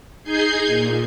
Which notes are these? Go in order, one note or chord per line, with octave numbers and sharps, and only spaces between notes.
D#4 G#4 G6 G#6 C7
A#2